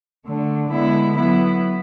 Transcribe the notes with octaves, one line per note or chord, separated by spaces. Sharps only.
D3 A3 D4
D3 G#3 B3 E4
F#3 B3 E4